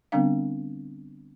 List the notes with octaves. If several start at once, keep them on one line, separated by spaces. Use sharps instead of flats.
D3 G3 B3 C4 D4 F5